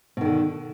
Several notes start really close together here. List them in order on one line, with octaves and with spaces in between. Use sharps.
B2 D#3 D3